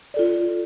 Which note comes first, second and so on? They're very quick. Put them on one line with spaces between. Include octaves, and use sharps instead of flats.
D5 A4 F4